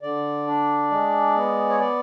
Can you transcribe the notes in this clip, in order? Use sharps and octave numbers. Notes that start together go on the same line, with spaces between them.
D3 D5
D4
G#3
B3
C#5
D5